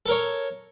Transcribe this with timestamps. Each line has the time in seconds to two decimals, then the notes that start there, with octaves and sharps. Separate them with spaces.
0.06 A4
0.08 A#4
0.11 C#5